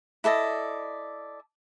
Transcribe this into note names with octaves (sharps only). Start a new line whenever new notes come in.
E4 A4 D5 D#5